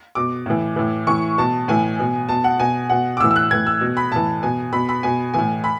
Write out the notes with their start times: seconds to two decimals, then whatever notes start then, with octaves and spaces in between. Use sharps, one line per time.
0.15 B2 D6
0.46 A2 E3
0.76 A2 E3
1.07 A2 E3 C#6
1.38 B2 A5
1.68 A2 E3 G#5
1.99 B2
2.29 B2 A5
2.44 F#5
2.60 B2 G#5
2.90 B2 F#5
3.17 D6
3.20 A2 E6
3.24 E3
3.31 E6
3.36 F#6
3.51 A2 E3 G#6
3.67 E6
3.81 B2
3.97 B5
4.11 A2 E3 A5
4.43 B2 G#5
4.72 B2 B5
4.89 B5
5.03 B2 G#5
5.34 A2 E3 G#5
5.64 B5